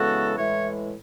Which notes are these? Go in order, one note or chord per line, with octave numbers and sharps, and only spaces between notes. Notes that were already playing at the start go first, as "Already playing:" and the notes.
Already playing: C#3 E3 G#3 B3 E4 F#4 A4
A2 E3 G#3 C#5 E5